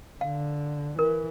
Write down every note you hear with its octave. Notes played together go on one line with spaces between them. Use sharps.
D3 F5
E3 A#4